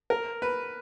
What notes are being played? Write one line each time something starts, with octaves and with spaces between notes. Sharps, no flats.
A#4
B4